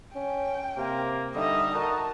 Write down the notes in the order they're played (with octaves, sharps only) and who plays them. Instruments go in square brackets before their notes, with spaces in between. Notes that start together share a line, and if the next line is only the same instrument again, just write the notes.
[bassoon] C#4 [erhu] G5
[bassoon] C3 [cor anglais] A#3
[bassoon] D3 [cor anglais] G3 [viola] D#4 D#5 [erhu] E5
[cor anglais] F#4 [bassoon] A#4 [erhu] A5